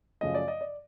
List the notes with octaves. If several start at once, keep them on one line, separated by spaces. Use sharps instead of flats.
F#2 C#3 F3 A3 D#5
D5
D#5
D5